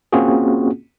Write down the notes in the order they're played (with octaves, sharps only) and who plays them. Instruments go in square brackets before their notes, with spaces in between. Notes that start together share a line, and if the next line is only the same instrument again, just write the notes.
[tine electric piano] A#3 C4 C#4 F4 F#4 G#4